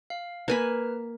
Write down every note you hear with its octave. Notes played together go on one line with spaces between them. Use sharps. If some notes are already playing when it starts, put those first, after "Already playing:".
F5
A#3 B4 G#5 B5 F6